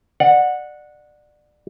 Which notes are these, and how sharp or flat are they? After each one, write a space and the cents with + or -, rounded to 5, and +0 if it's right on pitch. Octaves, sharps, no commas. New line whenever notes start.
D5 +25 F#5 -15